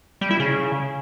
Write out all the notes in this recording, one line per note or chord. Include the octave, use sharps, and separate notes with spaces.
G3
E4
C#3